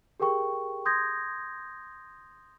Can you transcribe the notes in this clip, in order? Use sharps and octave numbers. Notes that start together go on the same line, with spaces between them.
G4 G#4 A#4 G5 C#6
C6 D#6 G6 G#6 A#6